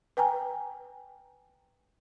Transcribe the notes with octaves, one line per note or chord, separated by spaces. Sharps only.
B4 G5 G#5 A#5